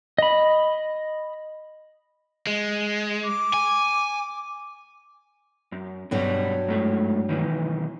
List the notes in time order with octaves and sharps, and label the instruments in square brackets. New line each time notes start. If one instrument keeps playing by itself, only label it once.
[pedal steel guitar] D#5 B5
[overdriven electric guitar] G#3
[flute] D6
[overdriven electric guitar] G#5
[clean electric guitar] F#2
[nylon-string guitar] G2 F#3 F#4 [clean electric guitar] B2 G3
[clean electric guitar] G#2 A3
B1 D#3 E3